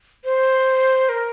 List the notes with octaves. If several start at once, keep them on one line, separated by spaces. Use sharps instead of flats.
C5
A#4